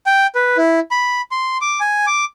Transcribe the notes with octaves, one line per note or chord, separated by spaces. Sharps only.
G5
B4
E4
B5
C6
D6
G#5
D6